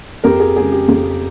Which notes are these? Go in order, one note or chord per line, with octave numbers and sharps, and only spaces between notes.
F2 G4 A#4
G#4
C#3 G#3 G#4
G4
F2 G#4